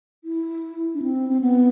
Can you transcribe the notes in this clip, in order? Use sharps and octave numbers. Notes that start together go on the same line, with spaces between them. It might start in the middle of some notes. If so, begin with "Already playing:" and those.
E4
D4
C4
C4
B3